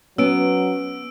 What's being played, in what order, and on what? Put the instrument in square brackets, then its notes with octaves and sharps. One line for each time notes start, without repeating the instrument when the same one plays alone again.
[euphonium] F#3 [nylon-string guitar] B3 [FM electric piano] C#4 [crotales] E6 D7